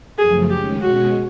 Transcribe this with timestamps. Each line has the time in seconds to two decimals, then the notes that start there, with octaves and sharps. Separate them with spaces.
0.18 F#2 C#3 F3 A3 G#4
0.50 D#3 G#3 C#4 G4
0.81 B2 G#3 C#4 F#4